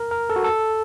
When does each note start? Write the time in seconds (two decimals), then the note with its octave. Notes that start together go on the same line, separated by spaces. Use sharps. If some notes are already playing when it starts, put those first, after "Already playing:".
Already playing: A#4
0.11 A#4
0.30 A4
0.36 F#4
0.44 A4